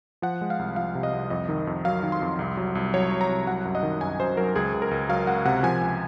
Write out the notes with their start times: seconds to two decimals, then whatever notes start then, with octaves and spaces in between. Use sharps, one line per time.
0.22 F3 F#5
0.41 G#3
0.50 F5
0.59 C2
0.76 F3 F5
0.95 C3
1.03 D#5
1.13 C2
1.30 F2 D#5
1.49 D#3
1.67 F2
1.85 F#3 F5
2.03 D#3
2.12 C6
2.22 F2
2.39 C2
2.57 F#3
2.75 C2
2.94 F#3 C#5
3.12 F#3
3.21 A#5
3.29 C2
3.47 F#3 F#5
3.65 F#2
3.75 D#5
3.83 D#3
4.01 F#2 G#5
4.19 F#2 C5
4.37 F#3 A#4
4.56 C#2 G#4
4.74 C#2
4.82 A#4
4.91 C#2
5.09 F#3 F5
5.27 C#2 F#5
5.45 C3 F#5
5.63 F3 G#5
5.81 C#2